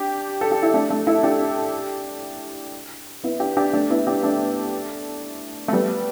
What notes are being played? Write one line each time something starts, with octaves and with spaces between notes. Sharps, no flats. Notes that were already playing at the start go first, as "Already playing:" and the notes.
Already playing: D4 G4
A4
G4
E4
A3 D4
A3
E4 A4
D4 G4
B3 E4
D4 G4
D4 G4
A3 D4
B3 E4
D4 G4
A3 D4
A3
G3 B3